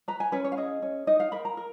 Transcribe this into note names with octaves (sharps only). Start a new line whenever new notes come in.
B4 A#5
G#5
C#4 B4
C#5
F5
G#4 D#5
C#4
D#4 D#5
F5
A#4 B5
A#5
A#4